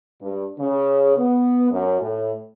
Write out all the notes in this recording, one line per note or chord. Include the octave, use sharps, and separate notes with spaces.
G2
C#3
B3
F#2
A2